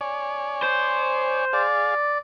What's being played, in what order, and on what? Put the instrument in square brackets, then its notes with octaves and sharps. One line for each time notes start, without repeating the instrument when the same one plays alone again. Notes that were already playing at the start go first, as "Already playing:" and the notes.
[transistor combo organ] C#5 D5 G#5
[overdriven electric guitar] C5
[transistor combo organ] G#4 F5 [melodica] D5